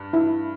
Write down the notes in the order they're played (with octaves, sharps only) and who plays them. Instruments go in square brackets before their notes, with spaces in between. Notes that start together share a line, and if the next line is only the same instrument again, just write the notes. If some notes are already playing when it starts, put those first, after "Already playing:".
Already playing: [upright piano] G2
[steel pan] E4